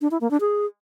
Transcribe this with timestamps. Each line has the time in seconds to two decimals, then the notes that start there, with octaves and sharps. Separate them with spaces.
0.01 D4
0.11 E4
0.21 A#3
0.31 D4
0.41 G#4